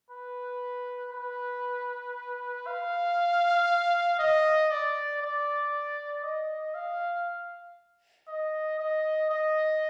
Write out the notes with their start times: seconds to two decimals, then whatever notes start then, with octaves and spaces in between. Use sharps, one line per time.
0.11 B4
1.13 B4
2.67 F5
4.19 D#5
4.71 D5
5.22 D5
6.23 D#5
6.75 F5
8.28 D#5
8.79 D#5
9.30 D#5